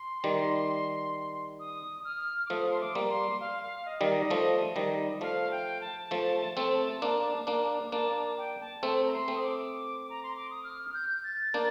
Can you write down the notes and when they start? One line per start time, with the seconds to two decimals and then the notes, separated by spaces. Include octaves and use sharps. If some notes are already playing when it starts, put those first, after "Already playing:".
Already playing: C6
0.24 D#3 G3
1.60 D#6
2.05 F6
2.46 D6
2.50 F3 A3 D#6
2.70 C6
2.81 D6
2.95 G3 A#3
3.10 C6
3.40 F5
3.63 F5
3.86 D#5
4.01 D#3 G3
4.09 D#5
4.30 F3 A3
4.76 D#3 G3
5.21 F3 A3 F5
5.51 G5
5.81 A5
6.11 F3 A3
6.57 A3 C4
7.02 A#3 D4
7.47 A#3 D4
7.92 A#3 D4 A5
8.38 G5
8.60 A5
8.83 A3 C4
9.06 A#5
9.13 C6
9.28 A3 C4
9.36 D#6
9.43 D6
10.10 A#5
10.23 C6
10.36 D6
10.50 D#6
10.64 F6
10.89 F6
10.94 G6
11.24 A6
11.54 A#3 D4 A6